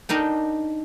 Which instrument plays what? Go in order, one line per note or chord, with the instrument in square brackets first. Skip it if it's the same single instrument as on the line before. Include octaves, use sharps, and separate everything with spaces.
[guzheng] D4 D#4 A#4 G5